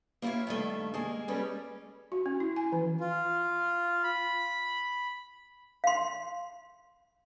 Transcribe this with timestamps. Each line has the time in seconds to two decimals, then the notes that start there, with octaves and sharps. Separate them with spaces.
0.22 A#3 E4 F4 C#5 E5
0.47 G2 D#3 A3
0.94 G#3 A#3 G#4
1.28 G3 G#3 C#4 A4 B4
2.12 F#4
2.26 C#4
2.40 E4
2.56 G#5
2.72 E3
3.00 F4
4.04 B5
5.84 F5 C6